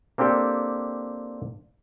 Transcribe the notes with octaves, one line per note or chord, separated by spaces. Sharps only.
A#3 C4 D4 G4 A4